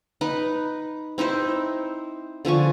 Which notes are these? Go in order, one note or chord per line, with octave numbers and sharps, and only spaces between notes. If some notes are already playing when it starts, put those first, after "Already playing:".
D#4 B4
C4 D#4 E4 C5
D3 F3 G#5 C#6